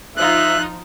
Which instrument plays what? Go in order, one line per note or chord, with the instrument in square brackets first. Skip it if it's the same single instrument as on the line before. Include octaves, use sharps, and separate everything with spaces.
[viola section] F3 D#4 F4 [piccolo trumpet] E5 [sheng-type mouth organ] F#6